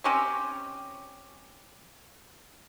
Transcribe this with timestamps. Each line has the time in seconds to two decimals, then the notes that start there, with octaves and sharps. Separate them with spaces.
0.04 C4 C#4 D#4 G4